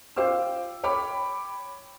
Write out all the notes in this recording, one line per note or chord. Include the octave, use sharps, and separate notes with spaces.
F4 C5 G5 D6 E6
C#5 G5 B5 D6